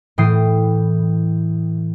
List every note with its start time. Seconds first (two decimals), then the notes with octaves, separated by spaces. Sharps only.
0.18 A2 E3 G5 D#6 C7